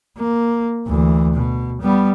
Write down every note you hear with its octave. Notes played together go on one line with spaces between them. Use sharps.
A#3
D2 E3
B2
G3 B3